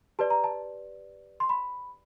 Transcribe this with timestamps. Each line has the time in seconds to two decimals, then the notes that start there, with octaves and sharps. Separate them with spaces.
0.19 G4 B4 D5 A5
0.30 A#5
0.44 A5
1.40 C6
1.49 B5